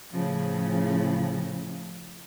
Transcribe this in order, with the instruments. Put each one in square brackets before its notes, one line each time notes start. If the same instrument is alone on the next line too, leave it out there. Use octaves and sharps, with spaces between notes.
[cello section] A2 C#3 F3